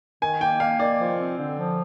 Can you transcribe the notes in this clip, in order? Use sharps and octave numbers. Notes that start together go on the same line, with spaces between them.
D#3 G#5
A#3 G5
A#3 F5
D#3 D5
F3
C4
D3
F3